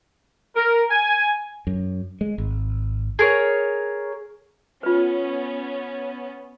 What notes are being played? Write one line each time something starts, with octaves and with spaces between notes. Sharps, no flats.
A#4
G#5
F#2
G#3
G#1
G#4 A#4 C#5
B3 C#4 F4 B4